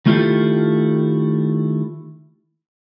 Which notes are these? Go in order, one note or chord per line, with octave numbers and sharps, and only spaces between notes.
D#3 A3 E4 F4 G4 A4